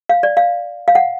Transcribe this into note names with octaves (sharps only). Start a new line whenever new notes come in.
F5
D5
F5
F5
F#5